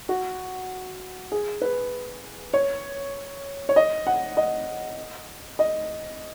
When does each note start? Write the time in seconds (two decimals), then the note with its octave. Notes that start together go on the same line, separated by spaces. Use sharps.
0.09 F#4
1.32 G#4
1.62 B4
2.54 C#5
3.69 C#5
3.76 D#5
4.07 F#5
4.37 D#5
5.59 D#5